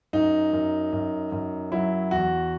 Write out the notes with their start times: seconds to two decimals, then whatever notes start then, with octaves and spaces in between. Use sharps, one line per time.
0.13 F#2 D#4
0.53 F#2
0.93 F#2
1.32 F#2
1.72 F#3 E4
2.11 E2 F#4